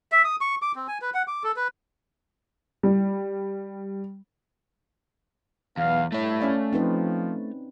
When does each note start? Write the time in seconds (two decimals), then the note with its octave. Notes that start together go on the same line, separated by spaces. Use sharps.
0.12 E5
0.24 D#6
0.41 C#6
0.62 D6
0.76 C4
0.88 G#5
1.02 B4
1.14 F#5
1.28 D6
1.44 A4
1.56 B4
2.83 G3
5.77 B1 E2 B3 F5
6.12 G2 A3 E4 C#5
6.41 C#4 D5 F5
6.73 F3 C4 D#4 B4